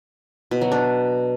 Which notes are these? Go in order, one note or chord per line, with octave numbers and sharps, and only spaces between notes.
B2
F#3
D4